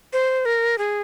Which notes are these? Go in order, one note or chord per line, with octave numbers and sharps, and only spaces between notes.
C5
A#4
G#4